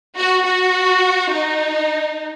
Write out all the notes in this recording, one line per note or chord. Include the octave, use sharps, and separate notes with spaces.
F#4
F#4
D#4